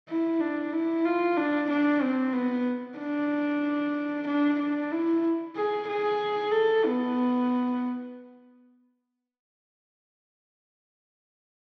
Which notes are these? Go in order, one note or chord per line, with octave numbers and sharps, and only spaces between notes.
E4
D4
E4
F4
D4
D4
C4
B3
D4
D4
D4
E4
G#4
G#4
A4
B3